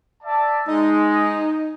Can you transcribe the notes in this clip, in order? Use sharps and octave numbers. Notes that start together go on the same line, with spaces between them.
D5 E5 A5
G#3 D#4